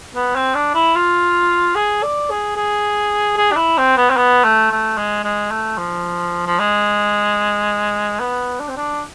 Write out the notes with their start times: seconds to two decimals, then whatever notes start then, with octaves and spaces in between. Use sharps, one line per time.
0.15 B3
0.35 C4
0.55 D4
0.75 E4
0.95 F4
1.75 G#4
2.03 D5
2.30 G#4
2.56 G#4
3.37 G#4
3.52 D4
3.56 E4
3.78 C4
3.97 B3
4.10 C4
4.17 B3
4.44 A3
4.71 A3
4.97 G#3
5.24 G#3
5.51 A3
5.78 F3
6.47 F3
6.59 G#3
8.20 B3
8.60 D4
8.68 C4
8.77 D4